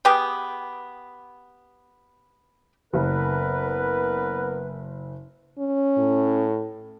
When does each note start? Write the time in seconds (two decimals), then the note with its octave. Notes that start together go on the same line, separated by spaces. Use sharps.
0.05 B3 G4 G#4 G5
2.94 F#1 B3 A#4 B4
5.59 C#4
5.98 A2